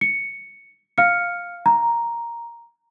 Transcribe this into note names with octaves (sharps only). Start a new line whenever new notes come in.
C#7
F5 F6 C#7
A#5